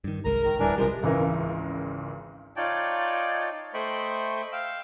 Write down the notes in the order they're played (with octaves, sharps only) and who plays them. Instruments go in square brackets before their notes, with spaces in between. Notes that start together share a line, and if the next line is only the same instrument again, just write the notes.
[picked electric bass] G2 D#3
[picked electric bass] G1 C2 G#3 [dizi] A#4 [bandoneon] A#5
[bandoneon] D#3 A#5
[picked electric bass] D1 G3 [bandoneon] E3 D4 A#4 [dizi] G#5
[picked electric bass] B1 C3 G3 [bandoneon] F3 G#3 [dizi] A#4
[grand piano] G#1 C#2 E3 A#4 F5
[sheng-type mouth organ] D#4 F4 C#5 D5 G5 A5
A3 C5 D#5 G5 B5 C#6
F5 G5 E6